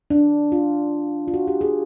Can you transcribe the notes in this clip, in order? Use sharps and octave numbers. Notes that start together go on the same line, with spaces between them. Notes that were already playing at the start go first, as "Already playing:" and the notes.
D4
F4
F4
F#4
G4
G#4